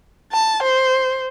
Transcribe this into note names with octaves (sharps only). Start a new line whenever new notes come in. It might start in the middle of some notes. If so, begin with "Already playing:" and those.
A5
C5